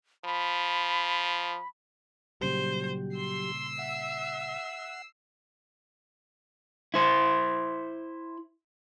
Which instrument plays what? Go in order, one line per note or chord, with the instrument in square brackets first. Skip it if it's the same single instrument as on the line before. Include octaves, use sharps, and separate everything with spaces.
[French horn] F3 [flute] B5
[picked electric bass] A#2 C#3 G3 [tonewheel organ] F#3 G4 [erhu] C5
[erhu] C6 [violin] E6 C7
[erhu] E5 [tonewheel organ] F#5
[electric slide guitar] E4 C5